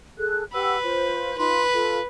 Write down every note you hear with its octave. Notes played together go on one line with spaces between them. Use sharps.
G#4 A4 F#6
G4 B4 F#5 E6
F4 C5
D#4 F4 B4 C6
F4 A4